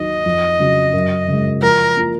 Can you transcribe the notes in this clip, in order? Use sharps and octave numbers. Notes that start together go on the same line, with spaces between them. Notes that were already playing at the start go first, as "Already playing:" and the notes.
Already playing: D#2 D#3 F#3 D#5
F2
C#3 F#3
F#2
C#3 G#3
F3 A#4
A#3 F4 A#4